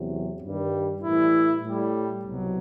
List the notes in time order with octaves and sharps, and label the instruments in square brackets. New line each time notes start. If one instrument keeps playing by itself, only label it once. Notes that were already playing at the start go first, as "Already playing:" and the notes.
Already playing: [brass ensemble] E2 C3 F#3
G2 D#3 G3
A2 E3 G3 E4
A2 G3
C2 B2 F#3